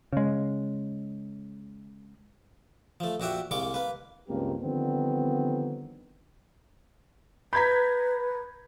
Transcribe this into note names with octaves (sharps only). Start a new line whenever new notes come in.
C#3 G#3
F3 A3
A#1 F#4 G4 E5 F#5
C2 G#3 A#3 C#6 D6
A#3 B4
C#2 G2 A#3 C4 G4 A#4
D3 D#3 F3 G3 B3 C4
B4 A#5 B5 G6 G#6 B6